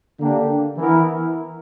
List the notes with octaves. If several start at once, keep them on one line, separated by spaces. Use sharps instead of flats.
D3 A#3 D4 G4
E3 B3 E4 A#4